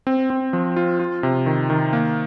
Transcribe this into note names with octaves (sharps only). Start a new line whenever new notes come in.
C4
C4
F3
F4
F4
C3
D#3
D#3
A#3